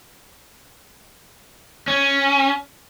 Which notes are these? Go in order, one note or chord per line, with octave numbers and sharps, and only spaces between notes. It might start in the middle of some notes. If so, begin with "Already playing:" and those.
C#4